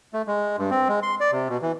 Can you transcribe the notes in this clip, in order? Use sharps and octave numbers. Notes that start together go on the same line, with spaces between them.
A3
G#3
G2
C4
G#3
C6
D5
C3
B2
E3